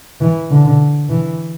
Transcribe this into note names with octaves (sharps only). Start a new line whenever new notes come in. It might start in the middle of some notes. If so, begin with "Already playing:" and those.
E3
D3
E3